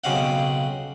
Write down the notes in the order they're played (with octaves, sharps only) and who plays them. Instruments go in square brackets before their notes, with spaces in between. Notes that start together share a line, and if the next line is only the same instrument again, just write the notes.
[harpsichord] B1 C#3 C4 F5 F#5